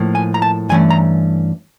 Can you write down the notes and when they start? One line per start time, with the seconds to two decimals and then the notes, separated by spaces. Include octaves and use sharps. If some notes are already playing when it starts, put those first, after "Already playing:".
Already playing: A2 F3 A#3
0.15 G#5
0.34 A#5
0.42 A5
0.69 G2 E3 A3 C#4 G#5
0.90 A#5